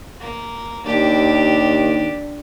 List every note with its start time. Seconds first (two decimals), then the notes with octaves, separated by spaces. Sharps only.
0.20 A#3
0.86 D#2 D4 G4